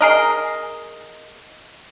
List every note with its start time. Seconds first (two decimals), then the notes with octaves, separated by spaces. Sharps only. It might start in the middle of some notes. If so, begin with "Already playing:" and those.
0.01 G#4 A#4 D#5